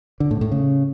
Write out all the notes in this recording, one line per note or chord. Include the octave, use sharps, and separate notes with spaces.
D3
A2
A2
C#3